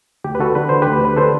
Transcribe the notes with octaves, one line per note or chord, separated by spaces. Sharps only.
D2 G4
B4
D3 F#4 A4
D3 B4
D2 C5
D2 G4 B4
D3 B4
D3 A4 C5